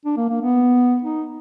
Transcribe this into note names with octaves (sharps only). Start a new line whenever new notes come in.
D4
A#3
A#3
B3
D#4